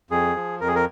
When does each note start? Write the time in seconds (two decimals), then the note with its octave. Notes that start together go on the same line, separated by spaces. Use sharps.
0.11 F2 G#4
0.36 F3
0.61 F2 A#4
0.68 G#4
0.76 A#4